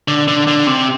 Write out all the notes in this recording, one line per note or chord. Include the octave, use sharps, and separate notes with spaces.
D3
D3
D3
C3